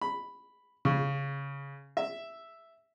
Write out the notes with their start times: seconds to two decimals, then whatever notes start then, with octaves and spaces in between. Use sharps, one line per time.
0.01 B5
0.85 C#3
1.97 E5